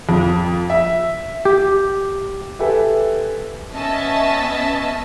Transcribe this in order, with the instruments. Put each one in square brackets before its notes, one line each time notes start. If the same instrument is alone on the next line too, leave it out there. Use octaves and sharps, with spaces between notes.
[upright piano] F2
E5
[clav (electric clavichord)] G4
[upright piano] G4 A4 B4 E5 G5 G#5
[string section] B3 C#4 D#5 E5 A5